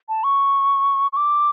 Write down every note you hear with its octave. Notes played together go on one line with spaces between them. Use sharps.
A5
C#6
C#6
D6